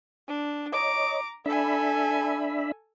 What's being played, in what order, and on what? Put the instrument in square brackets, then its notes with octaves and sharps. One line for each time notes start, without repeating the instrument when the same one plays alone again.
[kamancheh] D4
[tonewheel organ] C#5 D#5 [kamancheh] A#5 D6
[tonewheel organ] D4 E5 B5 [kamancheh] A4 G#5